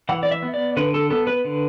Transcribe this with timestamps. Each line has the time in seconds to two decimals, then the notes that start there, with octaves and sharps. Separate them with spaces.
0.09 E3 F#5
0.23 D5
0.31 E5
0.42 B3
0.54 D5
0.77 D3 B4
0.94 A4
1.10 B3 A4
1.27 B4
1.45 D3